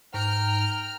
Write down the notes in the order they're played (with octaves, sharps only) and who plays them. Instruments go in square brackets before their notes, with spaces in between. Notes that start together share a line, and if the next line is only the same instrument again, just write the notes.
[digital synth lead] G#2 [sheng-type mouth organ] G5 A#5 [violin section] F6